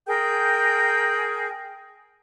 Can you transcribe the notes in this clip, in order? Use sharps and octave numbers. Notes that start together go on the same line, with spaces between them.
G#4 A#4 G5 G6